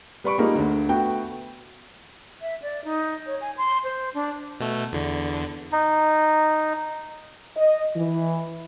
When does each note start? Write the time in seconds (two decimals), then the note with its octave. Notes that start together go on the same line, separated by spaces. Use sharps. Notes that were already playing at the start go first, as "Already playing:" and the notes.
0.24 G3 B4 D5 B5 C#6 D7
0.38 G3 G#3 A#3 D#4 F4
0.55 D2 D3
0.89 A3 B3 F#4 G5
2.42 E5
2.62 D5
2.84 D#4
3.26 C#5
3.41 G#5
3.57 C6
3.84 C5
4.14 D4
4.60 B2 A3
4.92 E2 D3
5.72 D#4
7.56 D#5
7.96 E3